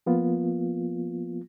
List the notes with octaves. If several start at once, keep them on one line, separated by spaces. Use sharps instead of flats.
F3 A#3 B3 F4